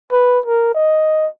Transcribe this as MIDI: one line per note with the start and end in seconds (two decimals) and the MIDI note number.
0.12 0.39 71
0.46 0.75 70
0.75 1.27 75